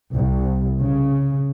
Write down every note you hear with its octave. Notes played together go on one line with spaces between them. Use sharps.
C2
C#3